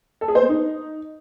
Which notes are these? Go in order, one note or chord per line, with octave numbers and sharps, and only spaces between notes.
A4
G#4
C5
B3
D#4